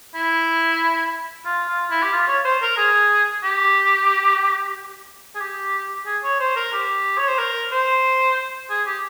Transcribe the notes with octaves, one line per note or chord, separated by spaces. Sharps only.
E4
F4
F4
E4
G4
F4
C#5
C5
A#4
G#4
G4
G#4
G4
G#4
C#5
C5
A#4
G4
C#5
C5
A#4
C5
G#4
G4